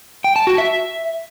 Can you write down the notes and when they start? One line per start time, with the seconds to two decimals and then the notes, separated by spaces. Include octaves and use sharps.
0.24 G5
0.36 A5
0.47 F#4
0.58 E5